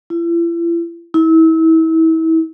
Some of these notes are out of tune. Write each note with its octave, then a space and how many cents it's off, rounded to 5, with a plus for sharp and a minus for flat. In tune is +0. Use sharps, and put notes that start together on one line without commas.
E4 +45
E4 -35